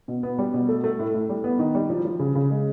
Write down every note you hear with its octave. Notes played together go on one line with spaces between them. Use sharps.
B2
B3
G3
B2
A3
A3
A2
A2
G3
B3
D#3
G3
F3
F3
C#3
C#3
G#3